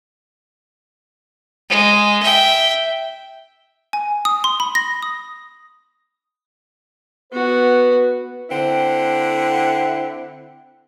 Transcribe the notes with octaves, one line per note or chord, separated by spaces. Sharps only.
G#3
E5 G5
G#5
D#6
C6
B5
A#6
D#6
B3 F#4 B4
D3 C4 E4 F#5